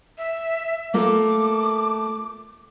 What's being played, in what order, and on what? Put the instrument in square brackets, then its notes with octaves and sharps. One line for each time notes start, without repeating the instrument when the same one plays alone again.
[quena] E5
[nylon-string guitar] A3 A#3 F4 [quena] D6